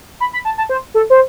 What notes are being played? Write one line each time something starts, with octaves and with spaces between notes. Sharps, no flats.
B5
B5
A5
A5
C5
A4
C5